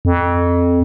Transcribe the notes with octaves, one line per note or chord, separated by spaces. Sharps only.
F2